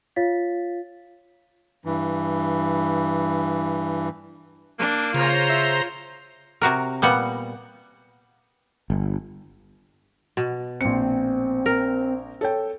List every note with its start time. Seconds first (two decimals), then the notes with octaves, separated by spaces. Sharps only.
0.16 F4 C#5 F5 A6 B6
1.85 G2 E3
4.79 A#3 D4
5.14 C#3 F4 C5 C#5 A#5
5.50 E5
6.62 C3 F#4 A#4
7.02 A#2 G3 B3 F#5
8.90 G1
10.37 B2
10.81 A#1 C4 C#7
11.66 A#4
12.41 A4 C#5 G5